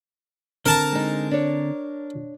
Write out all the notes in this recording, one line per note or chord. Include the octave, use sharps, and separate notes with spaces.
D3 C4 A#4 A5 A#5
G#3 D#4
D4 C#5